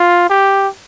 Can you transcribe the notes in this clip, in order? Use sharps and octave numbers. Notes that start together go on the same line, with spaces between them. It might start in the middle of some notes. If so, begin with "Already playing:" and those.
Already playing: F4
G4